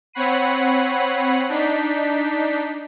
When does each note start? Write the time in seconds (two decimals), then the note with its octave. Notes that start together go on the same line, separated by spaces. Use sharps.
0.13 C4 C#5 F#5 B5 C7 D#7
1.49 D4 D#4 B6